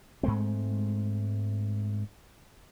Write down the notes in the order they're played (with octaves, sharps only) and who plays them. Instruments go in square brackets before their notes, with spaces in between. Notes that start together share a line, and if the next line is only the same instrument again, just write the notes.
[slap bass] G#2 G#3 A3 C4